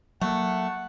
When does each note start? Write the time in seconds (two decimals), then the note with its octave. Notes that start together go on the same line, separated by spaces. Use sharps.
0.21 F#3 A3 A#3 F#5